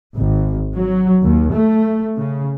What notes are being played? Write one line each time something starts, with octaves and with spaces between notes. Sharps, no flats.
G#1
F#3
D#2
A3
C#3